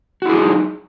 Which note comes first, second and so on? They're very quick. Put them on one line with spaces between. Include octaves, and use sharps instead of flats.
F#4 E4 G#4 F#3 D#4